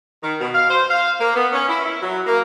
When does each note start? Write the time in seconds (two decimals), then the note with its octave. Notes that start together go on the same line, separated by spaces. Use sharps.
0.23 D#3
0.39 B2
0.54 F5
0.70 C5
0.90 F5
1.20 A#3
1.35 B3
1.53 C#4
1.69 E4
1.84 E4
2.01 F#3
2.26 A#3